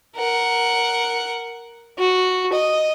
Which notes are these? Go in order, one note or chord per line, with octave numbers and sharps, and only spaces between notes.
A#4 F#5
F#4
D#5